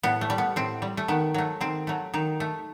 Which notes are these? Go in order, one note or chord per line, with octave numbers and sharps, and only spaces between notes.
A2 B3
A3
G3
B3
A2 C4
G3
A3
D#3 B3
F#3 A3
D#3 C4
F#3 A3
D#3 D#4
A3